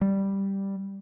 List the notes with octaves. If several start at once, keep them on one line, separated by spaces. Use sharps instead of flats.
G3